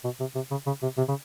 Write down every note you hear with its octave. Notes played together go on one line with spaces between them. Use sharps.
B2
C3
C3
C#3
C#3
C3
C3
C#3